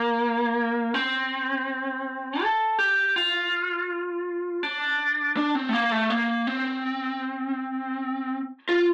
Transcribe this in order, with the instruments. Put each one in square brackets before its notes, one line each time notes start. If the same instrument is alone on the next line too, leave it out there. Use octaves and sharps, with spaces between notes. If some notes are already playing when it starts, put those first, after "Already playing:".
Already playing: [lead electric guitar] A#3
C4
A4
G4
F4
D4
D4
C4
A3
A#3
A3
A#3
C4
F4